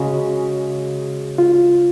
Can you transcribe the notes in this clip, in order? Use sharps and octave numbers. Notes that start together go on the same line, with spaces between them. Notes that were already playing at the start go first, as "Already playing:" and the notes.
Already playing: C#3 G#3 F#4
F4